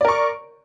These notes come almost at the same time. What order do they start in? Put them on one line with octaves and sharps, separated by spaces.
D5 A#4 C#6